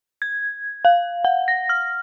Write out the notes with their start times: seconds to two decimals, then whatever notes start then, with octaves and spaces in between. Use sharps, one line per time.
0.22 G#6
0.85 F5
1.25 F#5
1.48 A#6
1.69 F6